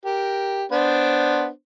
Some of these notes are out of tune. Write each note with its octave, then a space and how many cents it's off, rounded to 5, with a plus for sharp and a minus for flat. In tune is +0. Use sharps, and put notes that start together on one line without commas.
G4 +0 A#4 +5
B3 +0 D4 +0 C5 +0